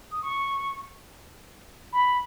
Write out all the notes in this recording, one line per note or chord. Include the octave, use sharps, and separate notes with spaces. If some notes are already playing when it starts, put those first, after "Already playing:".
D#6
C#6
B5